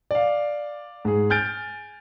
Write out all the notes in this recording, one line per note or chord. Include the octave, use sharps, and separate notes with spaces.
D5 F5
G#2 G#4
G#5 F6 G6 A6 D7